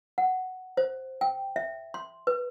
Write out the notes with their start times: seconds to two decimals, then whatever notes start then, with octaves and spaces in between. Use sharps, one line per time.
0.18 F#5
0.77 C5
1.21 G5
1.56 E5
1.94 C6
2.27 B4